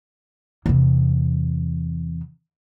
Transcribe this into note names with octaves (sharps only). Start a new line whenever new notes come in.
E2 C3